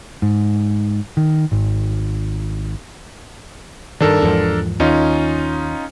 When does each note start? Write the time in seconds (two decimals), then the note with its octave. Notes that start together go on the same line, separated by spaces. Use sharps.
0.22 G#2
1.17 D#3
1.52 G#1
4.00 G2 D#3 D4 A4 A#4
4.22 E2 G#2 F3
4.80 D#2 C#4 D#4 F4